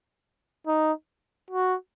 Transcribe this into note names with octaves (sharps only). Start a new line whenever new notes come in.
D#4
F#4